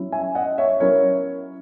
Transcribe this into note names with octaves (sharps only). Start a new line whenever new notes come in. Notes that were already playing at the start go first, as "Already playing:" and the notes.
Already playing: F#3 C#4 E4
E5 G#5
D#5 F#5
C#5 E5
F#3 C#4 E4 A#4 C#5